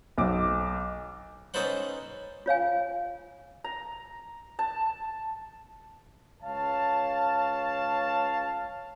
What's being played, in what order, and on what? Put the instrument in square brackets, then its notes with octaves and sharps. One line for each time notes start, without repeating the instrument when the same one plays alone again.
[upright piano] B1 D6
[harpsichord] C#4 D#4 A4 B4 C5 F#5
[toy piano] F4 C#5 F5 G#5
[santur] A#5
A5
[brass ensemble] C#2 C#5 F5 A5